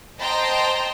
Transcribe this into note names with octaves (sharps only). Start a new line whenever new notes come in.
C5 D#5 G5 A5 A#5 C6